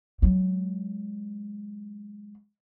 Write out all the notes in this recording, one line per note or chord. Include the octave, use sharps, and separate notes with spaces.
F#3 G#3